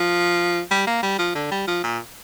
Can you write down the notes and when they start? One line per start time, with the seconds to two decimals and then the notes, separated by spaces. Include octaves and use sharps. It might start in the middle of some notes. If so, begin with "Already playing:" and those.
Already playing: F3
0.71 G3
0.87 A#3
1.03 G3
1.19 F3
1.35 D3
1.51 G3
1.67 F3
1.84 A#2